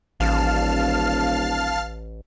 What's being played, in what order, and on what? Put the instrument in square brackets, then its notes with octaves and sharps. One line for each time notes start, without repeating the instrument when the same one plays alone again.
[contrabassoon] D#1 [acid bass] A1 [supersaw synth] F5 A5 F6